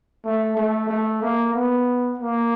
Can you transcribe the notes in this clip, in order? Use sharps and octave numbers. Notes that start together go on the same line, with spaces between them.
A3
A3
A3
A#3
B3
A#3